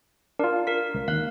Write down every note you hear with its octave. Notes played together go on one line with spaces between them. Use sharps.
D4 F4 A#4
A#4 B6
C#2
D#2 F5 F#6